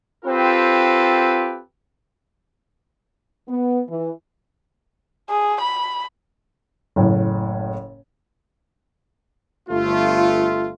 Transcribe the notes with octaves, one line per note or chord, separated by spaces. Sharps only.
C4 F4 G4 A4 B4
B3
E3
G#4
B5
F#1 A2
G1 A3 F4